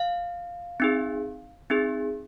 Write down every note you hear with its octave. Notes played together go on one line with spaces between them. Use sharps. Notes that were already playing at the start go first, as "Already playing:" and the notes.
Already playing: F5
C4 D#4 G#4
C4 D#4 G#4